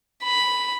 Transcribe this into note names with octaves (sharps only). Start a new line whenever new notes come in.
B5